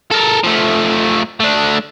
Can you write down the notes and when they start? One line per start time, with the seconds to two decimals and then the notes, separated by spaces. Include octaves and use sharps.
0.11 A4 A#4
0.44 F3 A3
1.40 A3 D4